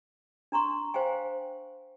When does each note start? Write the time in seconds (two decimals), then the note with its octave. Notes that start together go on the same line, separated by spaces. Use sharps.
0.52 D4 A#5 C6 C#6
0.94 C5 F5 G5 G#5